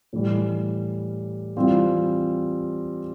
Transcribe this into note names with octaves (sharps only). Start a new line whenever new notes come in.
A2 E3 G3
E3 G3 C4 F4